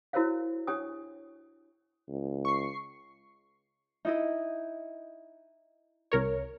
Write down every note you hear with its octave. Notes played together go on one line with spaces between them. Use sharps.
E4 F#4 A#4 C5 C#5 F5
D4 G4 C#5 G#5 D#6
C#2
C#6 C7
D#4 E4 D#5
C2 A#4 C#5